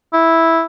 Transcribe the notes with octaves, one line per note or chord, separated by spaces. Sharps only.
E4